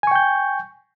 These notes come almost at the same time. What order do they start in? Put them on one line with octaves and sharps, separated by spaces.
G#5 C#6 G5 G6